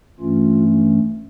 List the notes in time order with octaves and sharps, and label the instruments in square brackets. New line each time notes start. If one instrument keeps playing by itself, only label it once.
[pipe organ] G2 E3 A3 C#4 F4